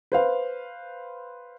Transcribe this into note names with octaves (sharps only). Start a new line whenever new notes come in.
B4 C5 F5